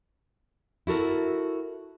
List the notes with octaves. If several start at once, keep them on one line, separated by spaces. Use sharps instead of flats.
E4 F#4 A4 A#4